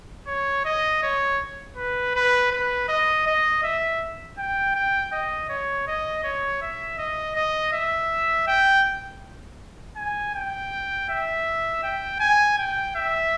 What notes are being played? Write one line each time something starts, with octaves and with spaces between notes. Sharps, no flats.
C#5
D#5
C#5
B4
B4
B4
D#5
D#5
E5
G5
G5
D#5
C#5
D#5
C#5
E5
D#5
D#5
E5
G5
G#5
G5
E5
G5
G#5
G5
E5